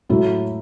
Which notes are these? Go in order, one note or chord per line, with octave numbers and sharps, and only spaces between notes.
A2 F#3 A3 E4